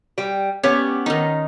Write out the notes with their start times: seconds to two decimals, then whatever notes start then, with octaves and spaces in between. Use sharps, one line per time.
0.18 G3 G5
0.63 B3 C#4 G4 C#5
1.06 D#3 D#4